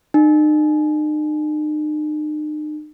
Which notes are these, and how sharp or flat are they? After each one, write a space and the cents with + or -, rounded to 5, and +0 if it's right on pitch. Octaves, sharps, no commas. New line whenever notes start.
D#4 -40